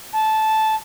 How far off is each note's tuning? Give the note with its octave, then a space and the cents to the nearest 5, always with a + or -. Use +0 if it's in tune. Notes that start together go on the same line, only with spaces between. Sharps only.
A5 -10